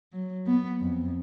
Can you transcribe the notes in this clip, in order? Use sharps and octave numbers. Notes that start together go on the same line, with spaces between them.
F#3
B3
F2